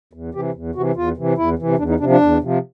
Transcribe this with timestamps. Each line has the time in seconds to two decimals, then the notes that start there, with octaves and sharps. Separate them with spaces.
0.13 E2
0.34 C3 E3 G4
0.54 E2
0.75 C3 E3 F#4
0.96 E2 F4
1.17 C3 E3
1.37 E2 E4
1.59 C3 E3
1.78 E2 D4
1.89 D#4
2.00 C3 F3 D4
2.10 D4
2.21 E2
2.42 C3 F3